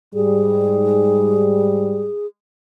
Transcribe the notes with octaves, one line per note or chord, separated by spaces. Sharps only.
G#2 G3 G#4